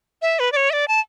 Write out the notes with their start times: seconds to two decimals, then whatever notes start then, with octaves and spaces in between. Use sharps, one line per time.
0.22 E5
0.39 B4
0.52 D5
0.56 C#5
0.70 E5
0.73 D5
0.88 A5